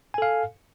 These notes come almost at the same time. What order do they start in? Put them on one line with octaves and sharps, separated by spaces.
G#5 A4 F5